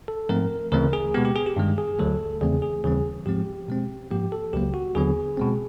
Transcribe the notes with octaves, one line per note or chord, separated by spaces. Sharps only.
A4
G#2 F3 A3 C4 A#4
D2 C#3 E3 A3 C4 A#4
G#4
B2 G#3 B3 G4
G4
G#4
G4
G2 D#3 G#3
G#4
D2 D3 F#3 A3 A4
E2 C#3 E3 A3 C4 G#4
G#4
D#2 C#3 E3 G3 C4 G#4
G#2 F3 G#3 C4 G4
B2 G#3 C4
G#2 F3 A#3 G4
A4
C#2 C#3 F#3 A#3 G4
F#4
D#2 D3 F#3 B3 G#4
B2 G#3 C4